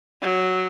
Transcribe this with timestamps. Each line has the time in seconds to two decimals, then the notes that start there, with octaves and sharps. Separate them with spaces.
0.22 F#3